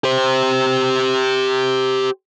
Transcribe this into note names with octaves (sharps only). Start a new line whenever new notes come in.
G4 C5